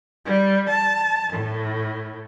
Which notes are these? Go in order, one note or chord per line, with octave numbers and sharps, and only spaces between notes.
G3
A5
A2